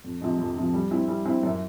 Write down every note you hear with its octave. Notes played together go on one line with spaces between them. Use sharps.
F2
C3 F3 G#3
F2
C3 F3 G#3
G3
C4 E4
G3
C4 E4
F#2